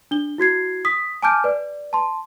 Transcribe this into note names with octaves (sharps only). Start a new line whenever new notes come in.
D4 G7
E4 F#4 G#6 C7
D#6 B6
G#5 A5 D6 F6 G6 D7
B4 D5
A5 C6